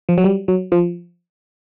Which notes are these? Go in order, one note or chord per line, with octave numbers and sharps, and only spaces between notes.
F3
F#3
G3
F#3
F3